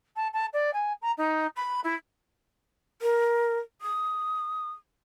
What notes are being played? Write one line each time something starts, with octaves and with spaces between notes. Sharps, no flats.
A5
A5
D5
G#5
A#5
D#4
B5
E4
A#4
D#6